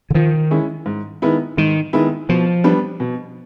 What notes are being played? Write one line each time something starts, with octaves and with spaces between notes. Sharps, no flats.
D3
D#3 F3
G#3 C#4 E4
G#2
D#3 G#3 B3 E4
G#2 D#3
D#3 G#3 B3 E4
B2 F3
G3 B3 D4
B2